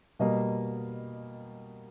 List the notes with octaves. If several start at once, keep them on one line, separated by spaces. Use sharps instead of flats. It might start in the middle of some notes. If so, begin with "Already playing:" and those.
B2 G3 A#3 D#5